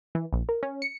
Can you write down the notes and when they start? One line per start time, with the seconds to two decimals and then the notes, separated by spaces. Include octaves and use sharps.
0.15 E3
0.33 A#1
0.49 A#4
0.63 C#4
0.82 C#7